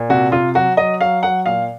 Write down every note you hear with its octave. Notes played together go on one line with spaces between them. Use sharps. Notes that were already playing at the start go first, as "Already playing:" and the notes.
Already playing: A#2
C3 F#4
C3 F4
F#3 F#4
F#3 D#5
F#3 F5
F#3 F#5
A#2 F5